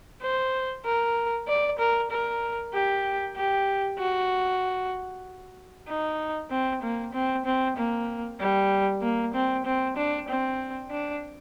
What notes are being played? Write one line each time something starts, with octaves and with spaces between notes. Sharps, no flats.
C5
A#4
D5
A#4
A#4
G4
G4
F#4
D#4
C4
A#3
C4
C4
A#3
G3
A#3
C4
C4
D4
C4
D4